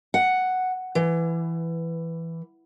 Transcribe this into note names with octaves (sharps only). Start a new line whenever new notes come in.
F#5
E3